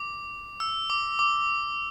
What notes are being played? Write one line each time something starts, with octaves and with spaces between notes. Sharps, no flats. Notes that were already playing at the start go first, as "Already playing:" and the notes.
Already playing: D6
E6
D6
D6